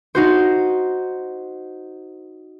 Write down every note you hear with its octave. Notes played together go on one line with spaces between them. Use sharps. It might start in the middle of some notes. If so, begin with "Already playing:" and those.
D#4 F#4 C5